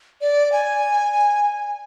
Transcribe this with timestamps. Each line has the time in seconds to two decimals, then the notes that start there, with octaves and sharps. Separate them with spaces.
0.21 D5
0.52 G#5